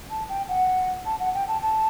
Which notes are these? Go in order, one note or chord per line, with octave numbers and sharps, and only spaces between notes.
A5
G5
F#5
A5
F#5
G5
A5
A5